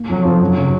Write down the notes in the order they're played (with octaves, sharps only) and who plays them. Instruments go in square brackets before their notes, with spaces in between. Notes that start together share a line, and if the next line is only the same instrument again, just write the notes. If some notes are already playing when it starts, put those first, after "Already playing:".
Already playing: [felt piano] A#3
[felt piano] F2 [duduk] F#3
[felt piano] F2 [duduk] F3
[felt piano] F#2 [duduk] F#3
[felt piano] C#3